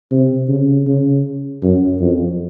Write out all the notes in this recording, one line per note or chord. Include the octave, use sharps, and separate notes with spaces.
C3
C#3
C#3
F#2
F2